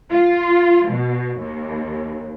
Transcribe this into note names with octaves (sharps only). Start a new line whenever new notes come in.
F4
B2
D#2